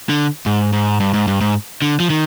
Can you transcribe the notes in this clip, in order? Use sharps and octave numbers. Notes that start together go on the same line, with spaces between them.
D3
G#2
G#2
G2
G#2
G2
G#2
D3
F3
D#3